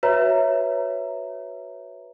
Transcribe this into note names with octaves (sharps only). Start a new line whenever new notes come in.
F#4 B4 C#5 E5 A#5